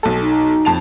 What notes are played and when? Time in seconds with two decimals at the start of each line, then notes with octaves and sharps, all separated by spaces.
0.03 B1 A4
0.21 D#4
0.65 F2 A5 F7